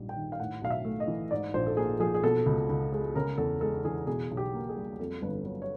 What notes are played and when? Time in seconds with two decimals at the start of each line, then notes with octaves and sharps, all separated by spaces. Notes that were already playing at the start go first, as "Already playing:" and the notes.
Already playing: A#1 G#2 G3
0.09 G5
0.16 D#3
0.32 F5
0.40 A2 F#5
0.62 B1 F5
0.71 E5
0.85 A3
1.00 D#5
1.08 E3
1.31 G#2 D5
1.54 A#1 C5
1.66 A4
1.77 A#3 G#4
2.00 F3 G#4
2.14 G#4
2.24 B2 A4
2.46 C#2
2.69 C#2
2.92 G#3
3.15 C#3 A#4
3.38 E2 A4
3.61 G#3 A4
3.85 E3 G#4
4.07 B2 G#4
4.31 B1
4.37 G4
4.54 A#3
4.69 G#4
4.77 G3
4.99 F2 A4
5.22 G1 B4
5.45 F#3 B4
5.62 C#5